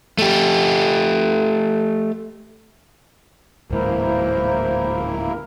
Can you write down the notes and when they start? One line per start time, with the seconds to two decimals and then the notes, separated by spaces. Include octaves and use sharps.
0.18 A3 G4
3.71 D1 G#2 E3 A#3 E4 A#4 C5